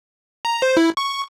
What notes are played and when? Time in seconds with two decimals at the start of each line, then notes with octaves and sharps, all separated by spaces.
0.45 A#5
0.62 C5
0.77 E4
0.97 C#6